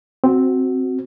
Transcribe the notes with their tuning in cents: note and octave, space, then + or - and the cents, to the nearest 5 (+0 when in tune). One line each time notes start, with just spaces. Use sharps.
C4 +0 F#4 +0